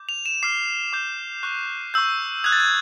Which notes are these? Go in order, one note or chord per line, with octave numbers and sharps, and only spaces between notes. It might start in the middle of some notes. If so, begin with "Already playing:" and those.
Already playing: D6 G6
F7
E7
D6 F6 C7
D6 G6
C#6 F#6
C#6 E6 G6
D#6 F#6 G#6
A6
G#6